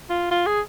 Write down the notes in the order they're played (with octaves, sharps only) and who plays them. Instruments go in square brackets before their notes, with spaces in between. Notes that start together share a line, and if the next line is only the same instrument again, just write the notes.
[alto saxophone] F4
F4
G#4